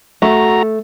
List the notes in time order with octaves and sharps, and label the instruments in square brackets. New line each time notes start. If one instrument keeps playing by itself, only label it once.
[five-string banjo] A3 [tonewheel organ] F#4 A#5